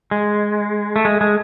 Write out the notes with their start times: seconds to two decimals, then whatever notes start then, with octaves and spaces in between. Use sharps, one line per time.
0.11 G#3
0.96 A3
1.05 G#3
1.21 G#3